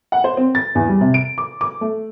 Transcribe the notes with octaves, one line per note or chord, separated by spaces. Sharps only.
F#5
C5
C4
A6
E2
G3
C3
D7
D6
D6
A3